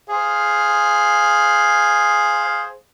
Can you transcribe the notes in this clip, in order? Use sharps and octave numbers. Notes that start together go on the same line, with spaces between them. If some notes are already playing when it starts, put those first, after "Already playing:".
G#4 C5 F5